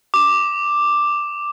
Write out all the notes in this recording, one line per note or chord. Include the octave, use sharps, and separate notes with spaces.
D6 E7